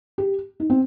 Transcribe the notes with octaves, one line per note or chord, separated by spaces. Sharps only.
G4
D#4
C4